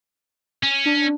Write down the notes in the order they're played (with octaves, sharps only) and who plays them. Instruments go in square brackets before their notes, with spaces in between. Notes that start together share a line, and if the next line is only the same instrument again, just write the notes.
[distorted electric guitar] C#4
[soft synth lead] D4